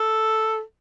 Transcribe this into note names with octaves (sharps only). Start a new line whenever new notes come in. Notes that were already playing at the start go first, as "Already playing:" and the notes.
Already playing: A4